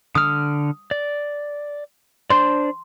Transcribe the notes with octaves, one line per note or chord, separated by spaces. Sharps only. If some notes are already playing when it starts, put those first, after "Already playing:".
D3 D#6 F6
D5
D4 C5 D5 C6